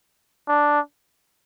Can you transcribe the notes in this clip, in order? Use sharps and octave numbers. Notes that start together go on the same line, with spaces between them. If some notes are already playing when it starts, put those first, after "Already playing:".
D4